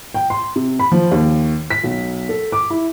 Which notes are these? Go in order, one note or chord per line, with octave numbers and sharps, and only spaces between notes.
G5
C6
C3
B5
F3
D#2
B6
B1
A4
D6
E4